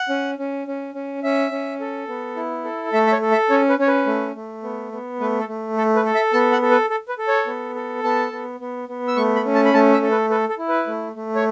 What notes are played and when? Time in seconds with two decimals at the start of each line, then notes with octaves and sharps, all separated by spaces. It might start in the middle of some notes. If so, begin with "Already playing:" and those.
Already playing: F#5
0.09 C#4
0.38 C#4
0.67 C#4
0.94 C#4
1.23 C#4 E5
1.52 C#4
1.80 A4
2.08 B3
2.36 E4
2.65 A4
2.93 A3 E5
3.07 E5
3.12 C#5
3.21 A4
3.31 E5
3.50 C#4 C#5
3.69 B4
3.79 C#4 C#5
3.88 B4
4.06 A3
4.35 A3
4.63 B3
4.92 B3
5.20 A3 B4
5.39 A4
5.48 A3
5.77 A4
5.96 B4
6.05 A4
6.15 E5
6.33 B3 A5
6.52 F#5
6.62 A4
6.71 B4
6.90 A4
7.08 B4
7.18 A4
7.28 C#5
7.47 B3
7.75 A4
8.04 B3 A5
8.33 B3
8.60 B3
8.89 B3
9.08 E6
9.16 A3 C#6
9.36 B5
9.46 C#4
9.55 A5
9.65 B5
9.74 A3 A5
9.93 E5
10.02 A4
10.11 B4
10.30 A4 B4
10.49 A4
10.58 E4
10.69 B4
10.87 A3
11.15 A3
11.35 C#5